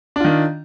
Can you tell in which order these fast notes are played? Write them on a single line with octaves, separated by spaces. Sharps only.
D4 F4 D#3